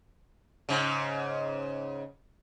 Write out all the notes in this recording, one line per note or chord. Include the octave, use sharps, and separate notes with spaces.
G#2 C#3